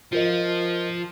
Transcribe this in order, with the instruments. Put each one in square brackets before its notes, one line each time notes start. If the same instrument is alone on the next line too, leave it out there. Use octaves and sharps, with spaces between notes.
[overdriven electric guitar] F3 [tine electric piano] F4 A#4 D#5